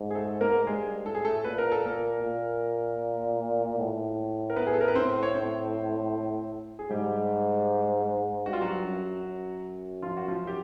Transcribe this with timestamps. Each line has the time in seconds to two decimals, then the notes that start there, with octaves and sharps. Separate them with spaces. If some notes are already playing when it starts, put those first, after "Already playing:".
Already playing: G#2
0.11 G#4
0.15 A3 A4
0.41 A#3 A#4
0.66 G2 G#3 G#4
1.06 A2 A4
1.15 G#4
1.25 A3 A4
1.44 A#2 B4
1.58 A#4
1.72 A4
1.86 A#3 A#4
2.23 A#2
3.79 A2
4.50 A#4
4.56 B3 B4
4.67 G#4
4.73 A4
4.81 A#4
4.88 B4
4.95 C4 C5
5.23 C#5
5.34 C4 C5
6.79 G#4
6.90 G#2 G3 G4
8.46 G2 F#4
8.53 F4
8.61 F#3 F#4
8.85 F#2
9.24 F#2
10.02 F3 F4
10.17 F#4
10.28 F3 F4
10.47 G4